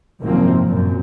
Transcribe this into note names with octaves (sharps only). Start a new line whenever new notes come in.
G#1 F#2 C3 F3 A#3 C4
F#2 A#2